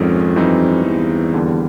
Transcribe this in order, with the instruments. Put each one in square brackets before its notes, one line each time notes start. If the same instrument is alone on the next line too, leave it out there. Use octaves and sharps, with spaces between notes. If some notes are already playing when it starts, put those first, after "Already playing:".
Already playing: [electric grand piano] G#1 G#2 D#3 G#3 C#4 [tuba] F2
[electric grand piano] G2 E3 G3 C4 D#4
[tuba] E2
[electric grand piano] D#2 D3 G3